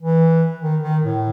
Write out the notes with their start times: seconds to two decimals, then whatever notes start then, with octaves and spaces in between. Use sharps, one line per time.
0.01 E3
0.62 D#3
0.83 D#3
1.03 A2